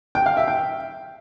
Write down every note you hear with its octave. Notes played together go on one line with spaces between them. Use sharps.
G5
F5
E5
G5